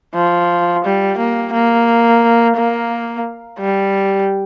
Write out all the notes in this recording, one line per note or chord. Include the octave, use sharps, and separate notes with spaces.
F3
G3
A#3
A#3
A#3
G3